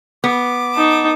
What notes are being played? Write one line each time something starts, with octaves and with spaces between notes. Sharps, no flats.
B3 D6
D#4 A5